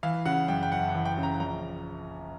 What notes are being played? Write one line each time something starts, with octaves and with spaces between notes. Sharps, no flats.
E3 F5
C#3 F#5
F#2 G5
G5
F#1 F#5
F#5
E3
G5
C#3
A#5
A#1 A#5